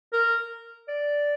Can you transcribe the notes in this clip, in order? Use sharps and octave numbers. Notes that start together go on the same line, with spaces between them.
A#4
D5